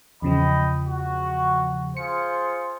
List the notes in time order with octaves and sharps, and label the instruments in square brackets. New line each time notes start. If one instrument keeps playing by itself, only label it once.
[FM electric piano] E2 C#3 F3 [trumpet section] D#5 G5 B5
[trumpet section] F#4
[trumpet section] F4 G#4 C5 [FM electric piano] C#7